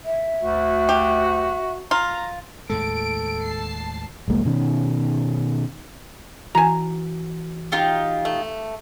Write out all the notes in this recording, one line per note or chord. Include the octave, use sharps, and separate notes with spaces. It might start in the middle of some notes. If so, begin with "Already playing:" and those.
E5
D2 F#4
G4
F4 A#5
D#2 A2 G#3 A4 D7
A5 C7
F1 C2 G#3 A#3
B2 D#3 C#4
E3 F#4 G#5 A#5
D#4 F4 G4
A3